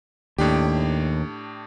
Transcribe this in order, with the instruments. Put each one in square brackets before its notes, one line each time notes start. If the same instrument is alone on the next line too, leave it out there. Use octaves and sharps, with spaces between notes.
[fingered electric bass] D#2 [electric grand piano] A2 D4 G4